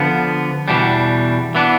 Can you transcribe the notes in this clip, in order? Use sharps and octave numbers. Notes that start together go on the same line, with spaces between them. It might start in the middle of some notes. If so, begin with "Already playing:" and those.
Already playing: D3 F3 B3
E2 B2 G3 D4
E3 B3 D4